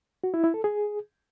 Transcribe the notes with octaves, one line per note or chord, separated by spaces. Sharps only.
F#4
E4
E4
A4
G#4